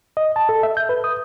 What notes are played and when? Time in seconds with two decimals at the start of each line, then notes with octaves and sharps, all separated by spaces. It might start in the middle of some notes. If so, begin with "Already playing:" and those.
0.17 D#5
0.36 A5
0.49 A4
0.63 E5
0.77 G6
0.89 B4
1.04 D#6